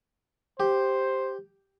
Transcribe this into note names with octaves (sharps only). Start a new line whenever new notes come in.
G4 C5